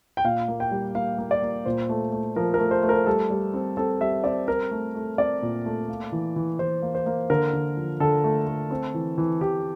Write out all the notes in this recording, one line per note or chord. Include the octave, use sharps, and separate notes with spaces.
G5
A#2 F5
A#3
G5
G3
A#3 F5
A#3
D5
A#3
A#2 C5
A3
A3
F3 A#4
A#4
A3
C5
A3
A#4
G3 A4
G3
C4
C4 A4
G3 E5
C4 D5
C4 A#4
A3
A3
C4 D5
A#2
A3
A#3
E3
E3
E3 C5
A#3
C5
A#3
D3 A#4
D3
F3
D3 A4
A3
A3
C4
E3
E3
E3 G4